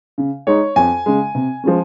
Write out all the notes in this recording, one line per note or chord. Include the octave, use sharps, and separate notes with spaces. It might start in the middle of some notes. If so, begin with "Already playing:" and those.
C#3
G#3 D#4 C#5
F2 G#5
C#3 G#3
C3
F3 G#3 C#4